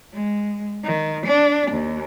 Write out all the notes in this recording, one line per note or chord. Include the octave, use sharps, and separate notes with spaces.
G#3
D#3
D4
D#2